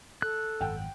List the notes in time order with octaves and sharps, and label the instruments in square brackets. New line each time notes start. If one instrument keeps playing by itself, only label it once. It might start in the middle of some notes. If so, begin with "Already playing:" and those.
[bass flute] A4 [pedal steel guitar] F#6
[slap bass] G#1 F#2 [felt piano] F#5 G5